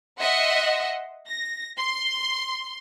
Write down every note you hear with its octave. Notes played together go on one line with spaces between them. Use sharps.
D#5 E5 F#5 C6
A#6
C6